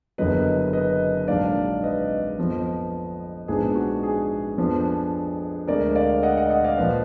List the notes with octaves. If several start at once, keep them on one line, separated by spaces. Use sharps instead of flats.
F#1 F#2 D3 F#3 B3 B4 D#5
B4 D#5
A#1 G#2 F#3 D4 D5 F5
B4 D#5
F2 F3 B3
A#1 G#2 F3 B3 D4 G#4
F#4
G#4
F2 F3 B3 D4
D2 D3 G#3 A#4 D5
D5 F5
D#5 F#5
D#5 F#5
D#5 F#5
D5 F5
A#1 A#2 F3 B4 D#5